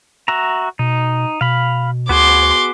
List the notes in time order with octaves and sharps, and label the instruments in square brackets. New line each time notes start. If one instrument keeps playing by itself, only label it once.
[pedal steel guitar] F#4 E5 A#5
[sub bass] B2 [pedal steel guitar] D#4
[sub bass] B2 [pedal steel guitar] F5 B5
[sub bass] D2 [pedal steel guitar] B3 F#4 G#4 [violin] C6 D6